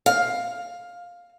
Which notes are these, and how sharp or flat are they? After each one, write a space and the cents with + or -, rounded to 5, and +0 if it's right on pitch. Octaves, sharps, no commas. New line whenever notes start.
F5 +10